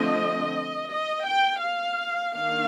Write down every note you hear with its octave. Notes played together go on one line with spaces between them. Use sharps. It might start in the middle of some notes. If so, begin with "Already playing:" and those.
Already playing: D3 F3 A3 C4 D#5
D#5
G5
F5
D#3 A#3 D4 F5